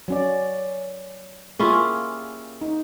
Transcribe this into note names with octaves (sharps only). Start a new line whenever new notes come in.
F#3 C#4 D5
A#3 C#4 E4 F4 G4 G#4
D#4